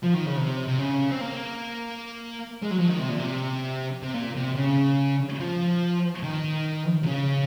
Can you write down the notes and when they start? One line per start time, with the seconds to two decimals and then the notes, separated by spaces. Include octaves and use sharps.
0.03 F3
0.15 D#3
0.26 C#3
0.37 C3
0.67 C3
0.79 C#3
1.11 C4
1.21 A#3
2.62 G#3
2.71 F#3
2.79 F3
2.88 D#3
2.99 C3
3.09 A#2
3.19 C3
4.02 C3
4.14 A#2
4.35 C3
4.56 C#3
5.40 F3
6.23 D#3
7.03 C3
7.07 C#3